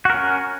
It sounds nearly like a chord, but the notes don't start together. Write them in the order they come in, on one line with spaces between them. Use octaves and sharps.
F#4 A#4 C#4